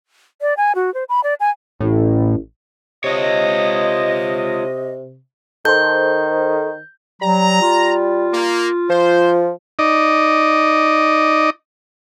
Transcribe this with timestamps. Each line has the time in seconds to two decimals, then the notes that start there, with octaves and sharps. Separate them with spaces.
0.41 D5
0.57 G#5
0.75 F#4
0.94 C5
1.09 B5
1.24 D5
1.40 G#5
1.81 A1 A2
3.04 C3 F4 C#5 D#5
5.65 D#3 A4 C5 G6
7.22 F#3 G3 A#5
7.61 F4
8.33 A#3
8.90 F3 C5
9.79 D#4 D5 D#5